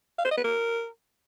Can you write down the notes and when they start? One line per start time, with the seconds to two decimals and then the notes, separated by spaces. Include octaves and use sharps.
0.18 F5
0.24 C5
0.31 D#5
0.37 B4
0.44 A#4